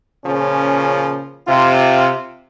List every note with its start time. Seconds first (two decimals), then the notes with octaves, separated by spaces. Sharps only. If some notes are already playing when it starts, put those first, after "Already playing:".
0.25 A#2 C#3 F3 C#4
1.47 C3 F4